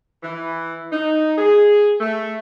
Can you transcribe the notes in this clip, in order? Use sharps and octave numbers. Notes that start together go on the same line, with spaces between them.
E3
D#4
G#4
A3